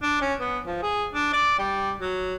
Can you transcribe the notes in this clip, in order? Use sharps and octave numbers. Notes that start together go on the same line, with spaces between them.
D4
C#4
B3
F3
G#4
D4
D5
G3
F#3